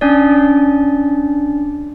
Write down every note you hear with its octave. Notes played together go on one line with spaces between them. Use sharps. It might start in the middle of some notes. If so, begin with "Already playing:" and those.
C#4 D4 D5